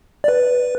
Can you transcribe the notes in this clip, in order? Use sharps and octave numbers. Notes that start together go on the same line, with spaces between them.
D5
B4